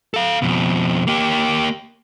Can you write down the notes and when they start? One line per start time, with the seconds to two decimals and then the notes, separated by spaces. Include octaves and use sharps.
0.14 A4 F5
0.42 F2 B2
1.07 A#3 G4